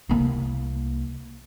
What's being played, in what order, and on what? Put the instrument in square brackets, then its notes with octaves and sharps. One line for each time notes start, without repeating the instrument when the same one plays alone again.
[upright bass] C2 A#3